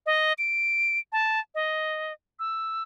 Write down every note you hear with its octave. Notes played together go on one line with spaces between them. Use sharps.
D#5
D7
A5
D#5
E6